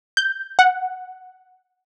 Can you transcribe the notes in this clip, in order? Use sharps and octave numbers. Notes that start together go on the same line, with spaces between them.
G6
F#5